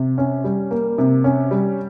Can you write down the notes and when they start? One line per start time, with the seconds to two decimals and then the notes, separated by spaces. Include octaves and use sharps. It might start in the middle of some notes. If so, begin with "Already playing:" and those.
Already playing: C3
0.18 C#4
0.44 G3
0.71 A#3
0.98 C3
1.24 C#4
1.51 G3